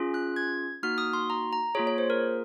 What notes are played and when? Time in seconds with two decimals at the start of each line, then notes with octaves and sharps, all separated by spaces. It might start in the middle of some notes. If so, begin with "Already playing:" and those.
Already playing: C#4 F4 G#4
0.14 F#6
0.36 G#6
0.83 A#3 D#4 F#4 F6
0.98 D#6
1.13 C6
1.30 A#5
1.53 A#5
1.75 A#3 F4 G#4 C#5
1.87 C#5
1.98 C5
2.10 A#4